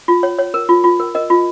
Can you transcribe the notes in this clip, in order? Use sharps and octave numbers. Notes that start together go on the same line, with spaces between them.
F4
C#5
C#5
A#4
F4
F4
A#4
A#4 D#5
F4